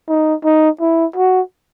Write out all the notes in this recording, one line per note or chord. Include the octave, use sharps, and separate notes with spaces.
D#4
D#4
E4
F#4